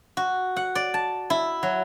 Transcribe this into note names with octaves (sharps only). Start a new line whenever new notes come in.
F#4
F#5
D5
A5
E4
F#3